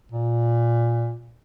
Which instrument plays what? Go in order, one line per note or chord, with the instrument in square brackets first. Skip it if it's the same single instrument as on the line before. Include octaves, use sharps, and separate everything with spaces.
[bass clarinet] A#2